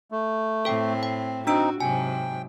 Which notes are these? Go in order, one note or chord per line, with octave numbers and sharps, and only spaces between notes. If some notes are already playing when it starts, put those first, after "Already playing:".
A3
A2 C4 A4 G5
G5
C4 D4 D#4 F#4 E6 D7
G#2 C3 F#3 G5 G#5